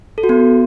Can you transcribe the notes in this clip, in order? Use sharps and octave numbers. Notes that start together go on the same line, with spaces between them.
A4
F#4
B3